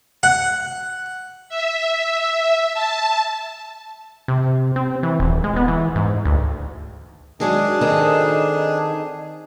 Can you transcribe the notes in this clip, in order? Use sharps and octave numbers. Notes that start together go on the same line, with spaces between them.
F#5
E5
A5
C3
C4
E3
D#1
G#3
B3
E3
G#2
D2
D#3 F#3 G#3 D4 G#4
D#3 C4 D#4 A4